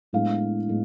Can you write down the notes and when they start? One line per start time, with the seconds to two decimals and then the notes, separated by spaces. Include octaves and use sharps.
0.13 A2 G#3 B3 D4 F5
0.68 A2 G#3 B3